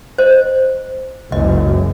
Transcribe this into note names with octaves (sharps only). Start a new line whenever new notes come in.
C5 D#5
F#1 C#2 F#2 D#5